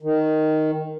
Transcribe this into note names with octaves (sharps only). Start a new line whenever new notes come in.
D#3